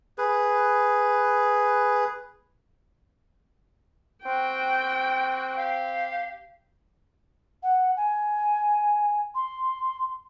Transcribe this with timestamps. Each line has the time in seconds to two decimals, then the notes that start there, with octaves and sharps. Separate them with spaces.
0.18 G#4 B4
4.25 C4 F#4 G5
5.56 G4 F5
7.63 F#5
7.97 G#5
9.35 C6